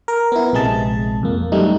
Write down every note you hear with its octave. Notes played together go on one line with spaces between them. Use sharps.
A#4
B3 E4
A#1 C3 G#3 G#4 A5
F2 A#3
F#2 G3 A3 D#4